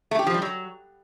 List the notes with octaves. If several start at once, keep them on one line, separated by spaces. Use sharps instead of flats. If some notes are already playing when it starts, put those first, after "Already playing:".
A3
G4
F3
G3
F#3